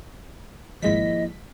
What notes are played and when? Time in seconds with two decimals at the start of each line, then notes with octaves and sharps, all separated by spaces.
0.82 G#1 F3 G#3 A#3 E4 D#5 B6